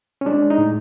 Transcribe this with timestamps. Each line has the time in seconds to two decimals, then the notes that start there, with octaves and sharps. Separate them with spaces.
0.21 C#4
0.26 G#3 D4
0.50 D#4
0.58 A2